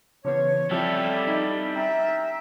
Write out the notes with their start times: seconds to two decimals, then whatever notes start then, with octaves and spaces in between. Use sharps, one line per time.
0.25 C#3 E3 B3 C#5
0.71 F3 G3 C4 E4 G4 A4 F6
1.27 D#4
1.75 C#4 E5 G5 A#5